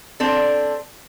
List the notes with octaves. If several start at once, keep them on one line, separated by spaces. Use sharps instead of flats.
C4 D4 A4